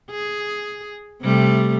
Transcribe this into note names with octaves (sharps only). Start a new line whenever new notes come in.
G#4
C3 G3 A3